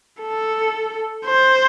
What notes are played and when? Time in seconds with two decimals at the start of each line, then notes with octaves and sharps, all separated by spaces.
0.23 A4
1.25 C5